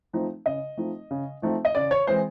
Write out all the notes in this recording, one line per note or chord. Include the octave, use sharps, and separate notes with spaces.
F3 A3 C4 D#4
C#3 D#5
F3 A3 C4 D#4
C#3
F3 A3 C4 D#4
D#5
C#3 D5
C#5
E3 G#3 C4 C5